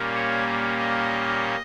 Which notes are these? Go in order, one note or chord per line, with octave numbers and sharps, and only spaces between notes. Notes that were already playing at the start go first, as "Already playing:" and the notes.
Already playing: A#2 G3 A#3 C#4
C#5
D#5